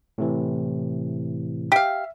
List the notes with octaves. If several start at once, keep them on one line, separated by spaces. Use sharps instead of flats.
A2 C3 E3
G4 E5 F5